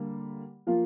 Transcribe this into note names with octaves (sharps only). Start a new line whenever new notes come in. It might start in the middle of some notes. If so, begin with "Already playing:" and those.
Already playing: D3 G3 A#3
F3 A#3 F4